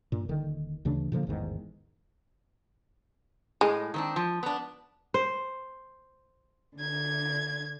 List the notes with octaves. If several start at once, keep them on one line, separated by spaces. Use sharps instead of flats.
G2 A#2
D#1 D3 D#3
D2 C#3 E3 D4
A#2 D3 F3 A#3
A1 E2 G#2 D#3
A2 G#3
D#3 C4 D4
F3
B3 D4
C5
D3 G#6